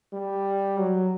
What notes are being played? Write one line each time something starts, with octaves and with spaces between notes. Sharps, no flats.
G3
F#3